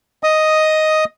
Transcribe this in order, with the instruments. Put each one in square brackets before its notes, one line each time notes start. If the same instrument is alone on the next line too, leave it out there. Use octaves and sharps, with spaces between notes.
[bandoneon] D#5 D#6